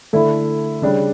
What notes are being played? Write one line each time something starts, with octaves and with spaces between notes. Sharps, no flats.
D3 A3 E4
C#3 G3 D4